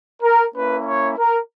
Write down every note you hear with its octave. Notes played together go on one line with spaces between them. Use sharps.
A#4
A#3 C#4 E4 B4
C#5
A#4